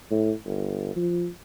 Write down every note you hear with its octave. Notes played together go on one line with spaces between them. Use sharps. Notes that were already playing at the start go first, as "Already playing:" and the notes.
A2
G1
F3